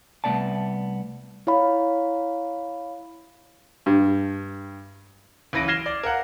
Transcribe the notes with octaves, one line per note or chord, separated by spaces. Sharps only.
C2 F#2 A3 B3 D5 A5
E4 C#5 F5 B5
G2
F#1 E3 B4 A#6 D7
F6 G#6 A#6 C7 E7 G7
D5
A#4 F5 F#5